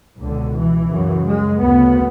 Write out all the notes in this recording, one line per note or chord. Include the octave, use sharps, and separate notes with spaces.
C#2 B2 D3
E3
F#2 C#3
G#3
D2 C#3 B3